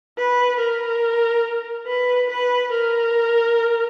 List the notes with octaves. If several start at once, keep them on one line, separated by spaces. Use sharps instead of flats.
B4
A#4
B4
B4
A#4